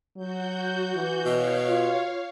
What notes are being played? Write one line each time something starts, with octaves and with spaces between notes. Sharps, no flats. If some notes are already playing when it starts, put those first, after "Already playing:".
F#3 F#4 G6
E3
B2 C#5 F5
F4